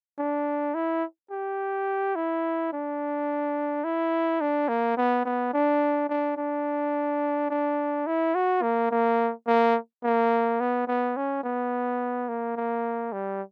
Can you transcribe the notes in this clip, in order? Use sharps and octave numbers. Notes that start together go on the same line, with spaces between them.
D4
E4
G4
E4
D4
E4
D4
A#3
B3
B3
D4
D4
D4
D4
E4
F#4
A#3
A#3
A#3
A#3
B3
B3
C#4
B3
A#3
A#3
G3